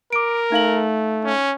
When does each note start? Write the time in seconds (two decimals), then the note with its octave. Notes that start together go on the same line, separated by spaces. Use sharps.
0.13 A#4 D6 D7
0.52 A3 D#4 F5 F#7
1.24 C#4